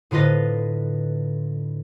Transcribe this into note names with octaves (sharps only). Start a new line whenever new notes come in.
A2 D3 F4 B4 D#5